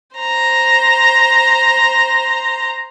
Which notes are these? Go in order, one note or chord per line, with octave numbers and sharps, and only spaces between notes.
C5 A#5